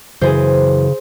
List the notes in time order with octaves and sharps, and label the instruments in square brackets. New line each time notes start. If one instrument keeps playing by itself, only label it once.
[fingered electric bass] F#2 E3 [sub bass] C#3 [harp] G#4 C5